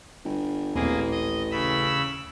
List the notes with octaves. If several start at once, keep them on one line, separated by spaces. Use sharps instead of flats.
G1
D#1 A1 A#3 C4 G#4
D#5
C#3 B5 E6